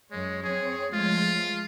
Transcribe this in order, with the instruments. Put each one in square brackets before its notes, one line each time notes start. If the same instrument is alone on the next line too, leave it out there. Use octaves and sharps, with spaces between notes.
[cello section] F#2 C#5 [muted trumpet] G#3
[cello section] C4 C#5 [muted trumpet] G#4
[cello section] F3 G#3 A3 [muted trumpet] F4